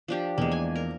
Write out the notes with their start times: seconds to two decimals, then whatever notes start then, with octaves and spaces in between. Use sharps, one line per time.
0.08 F3 D4 G4
0.38 E2 G#3 A#3
0.52 G#5
0.76 A#4